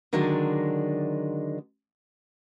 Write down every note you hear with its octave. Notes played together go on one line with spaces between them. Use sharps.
D3 D#3 F#3 G#3 D4